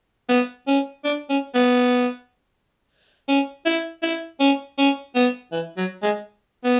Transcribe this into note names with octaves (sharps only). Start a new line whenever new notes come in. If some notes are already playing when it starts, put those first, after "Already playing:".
B3
C#4
D4
C#4
B3
C#4
E4
E4
C#4
C#4
B3
E3
F#3
G#3
B3